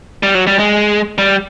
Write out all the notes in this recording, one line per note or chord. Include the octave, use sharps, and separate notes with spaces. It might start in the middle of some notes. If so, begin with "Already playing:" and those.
G3
F#3
G3
G#3
G3